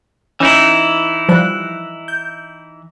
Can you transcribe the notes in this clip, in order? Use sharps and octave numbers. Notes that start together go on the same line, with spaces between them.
E3 C#4 D#4 E4
F3 G3 F#6
G6